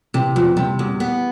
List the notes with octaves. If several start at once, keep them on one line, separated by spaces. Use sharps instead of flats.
C3 E3
E2 F3
C3 G3
E2
B3